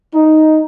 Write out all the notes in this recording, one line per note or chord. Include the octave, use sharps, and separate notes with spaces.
D#4